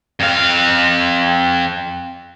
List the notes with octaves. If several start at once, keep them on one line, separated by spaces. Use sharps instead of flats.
F2 F5